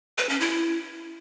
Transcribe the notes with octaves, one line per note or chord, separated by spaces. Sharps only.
B4
C#4
E4